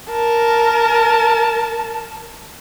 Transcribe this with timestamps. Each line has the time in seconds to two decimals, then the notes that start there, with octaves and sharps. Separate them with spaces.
0.10 A#4 A5